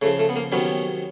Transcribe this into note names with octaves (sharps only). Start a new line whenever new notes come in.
C#3 F3 A3
A3
B3
A#3
C3 D#3 F#3 B3 C#4